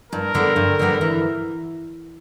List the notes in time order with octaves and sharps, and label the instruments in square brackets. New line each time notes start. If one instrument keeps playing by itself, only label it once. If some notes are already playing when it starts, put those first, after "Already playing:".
[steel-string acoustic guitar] G2 [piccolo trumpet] A#4
[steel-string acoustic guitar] D3 G3 B3
G2
D3 G3 B3
E3